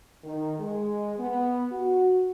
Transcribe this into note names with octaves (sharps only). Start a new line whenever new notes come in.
D#3
G#3
B3
F#4